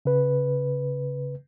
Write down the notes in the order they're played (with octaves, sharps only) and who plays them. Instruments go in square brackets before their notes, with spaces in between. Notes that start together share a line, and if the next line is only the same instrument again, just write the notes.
[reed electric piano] C#3 B4